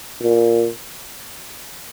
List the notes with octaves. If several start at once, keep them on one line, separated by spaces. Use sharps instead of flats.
A#2